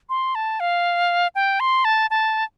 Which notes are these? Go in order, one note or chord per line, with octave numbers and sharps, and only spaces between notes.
C6
A5
F5
G5
C6
A5
A5